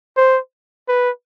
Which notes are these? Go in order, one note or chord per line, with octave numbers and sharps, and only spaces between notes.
C5
B4